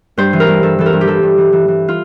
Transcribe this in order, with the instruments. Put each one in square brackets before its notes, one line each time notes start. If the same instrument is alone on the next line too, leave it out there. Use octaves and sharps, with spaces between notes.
[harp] G2 C5
E3
A#4
G2
G2 A4
E3 A4
A#4
G2
G4
E3 A4
G2
E3
E3
E3
F4